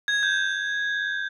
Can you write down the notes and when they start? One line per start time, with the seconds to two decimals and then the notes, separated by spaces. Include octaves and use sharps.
0.08 G#6
0.23 G6